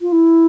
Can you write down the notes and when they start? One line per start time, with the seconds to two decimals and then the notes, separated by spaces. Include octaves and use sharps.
0.01 F4
0.12 E4